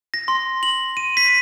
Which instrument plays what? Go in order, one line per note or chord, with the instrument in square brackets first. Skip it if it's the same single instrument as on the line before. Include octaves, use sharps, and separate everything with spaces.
[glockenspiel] A#6
C6
F#7
D#7
B6